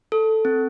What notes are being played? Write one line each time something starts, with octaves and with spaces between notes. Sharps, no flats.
A4
C4